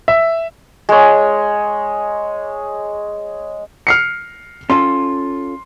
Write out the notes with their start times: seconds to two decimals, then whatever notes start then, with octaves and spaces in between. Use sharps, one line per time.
0.08 E5
0.89 G#3 C#5
3.87 F6 C7 C#7
4.70 C#4 F4 A4 C6